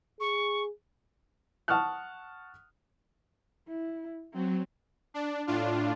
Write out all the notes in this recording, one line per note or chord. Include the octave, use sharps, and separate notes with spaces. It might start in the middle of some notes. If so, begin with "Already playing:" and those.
G#4 C#6
F#5 A5 C#6 D#6 F6 F#6
E4
F#3 C4
D4
A2 D4 F4